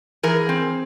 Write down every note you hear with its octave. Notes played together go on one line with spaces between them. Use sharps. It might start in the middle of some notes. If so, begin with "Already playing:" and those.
E3 G#4 A#4
C4